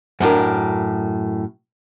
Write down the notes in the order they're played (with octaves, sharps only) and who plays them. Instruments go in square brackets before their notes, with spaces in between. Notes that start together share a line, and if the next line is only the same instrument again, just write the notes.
[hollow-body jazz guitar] F#2 A2 D4 A#4